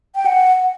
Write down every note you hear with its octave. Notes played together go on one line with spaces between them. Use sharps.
G5
F#5